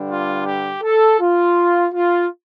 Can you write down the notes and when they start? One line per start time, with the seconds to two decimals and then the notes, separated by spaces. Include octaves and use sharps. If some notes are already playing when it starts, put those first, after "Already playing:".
Already playing: G2 D3 G3 D4
0.09 F4
0.45 G4
0.82 A4
1.20 F4
1.93 F4